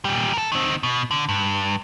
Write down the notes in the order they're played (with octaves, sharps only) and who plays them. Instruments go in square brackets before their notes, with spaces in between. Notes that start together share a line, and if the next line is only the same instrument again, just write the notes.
[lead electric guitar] A#2 G3
A4 A#4
D#3 C4
B2
D3
G2